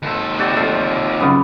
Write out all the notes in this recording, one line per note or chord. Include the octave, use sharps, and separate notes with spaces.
D#2 A4
C3 F#4 D5
F3 A3
F#2 C#3 B3